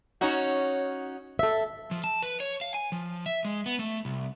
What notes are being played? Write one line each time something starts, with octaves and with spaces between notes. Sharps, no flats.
C#4 D#4 F#4
A4 E5
F3
A5
B4
C#5
F5
G#5
F3
E5
G#3
B3
A3
C2